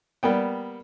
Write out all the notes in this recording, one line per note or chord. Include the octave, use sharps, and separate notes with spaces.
G3 A#3 B3 G5